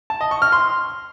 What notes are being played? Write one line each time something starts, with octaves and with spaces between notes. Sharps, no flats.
A5
D#5
C#6
F6
C6